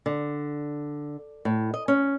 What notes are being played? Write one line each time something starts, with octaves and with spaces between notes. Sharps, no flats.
D3
A2
D#5
C#4